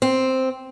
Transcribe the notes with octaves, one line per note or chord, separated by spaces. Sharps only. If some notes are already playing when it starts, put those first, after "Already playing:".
C4